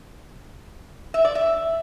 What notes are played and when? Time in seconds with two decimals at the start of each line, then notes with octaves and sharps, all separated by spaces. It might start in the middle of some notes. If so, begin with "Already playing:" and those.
1.14 E5
1.25 D5
1.35 E5